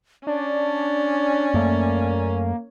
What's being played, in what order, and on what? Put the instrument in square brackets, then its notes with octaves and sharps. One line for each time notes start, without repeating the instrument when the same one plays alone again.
[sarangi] C#4 [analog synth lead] D4 [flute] D5
[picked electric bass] F#2 A3 [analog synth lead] A#3